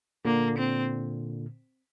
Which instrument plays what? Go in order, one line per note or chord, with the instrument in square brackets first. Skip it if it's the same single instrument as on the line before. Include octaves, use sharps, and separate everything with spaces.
[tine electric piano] A#2 D3 [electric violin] A#3
[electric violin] C4